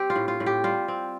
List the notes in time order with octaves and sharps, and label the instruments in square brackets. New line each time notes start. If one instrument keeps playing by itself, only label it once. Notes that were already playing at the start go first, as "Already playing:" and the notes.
Already playing: [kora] C4 G4
F4
A2
F4
A2
G4
G3 F4
C4